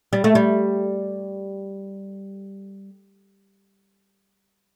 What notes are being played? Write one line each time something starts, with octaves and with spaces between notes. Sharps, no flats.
G3
A3
G3